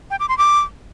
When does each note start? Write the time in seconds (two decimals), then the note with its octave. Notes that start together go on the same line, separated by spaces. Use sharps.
0.10 G5
0.20 D6
0.29 C6
0.38 D6